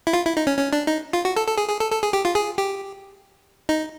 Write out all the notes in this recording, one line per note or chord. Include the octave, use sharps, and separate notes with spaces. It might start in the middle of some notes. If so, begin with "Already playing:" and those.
E4
F4
E4
D#4
C#4
C#4
D4
D#4
F4
F#4
A4
A4
G#4
G#4
A4
A4
G#4
G4
F4
G#4
G4
D#4